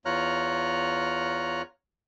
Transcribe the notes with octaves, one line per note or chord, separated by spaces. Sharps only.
E2 F4 C#5 A#5 F6 F#6